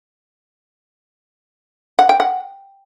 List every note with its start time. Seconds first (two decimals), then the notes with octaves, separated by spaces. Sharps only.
1.99 F#5
2.09 G5
2.20 F#5